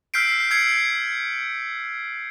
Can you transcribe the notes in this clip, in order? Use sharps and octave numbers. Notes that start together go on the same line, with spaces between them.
E6 F6 G6 B6 C7 D7
E6 G#6 C7 C#7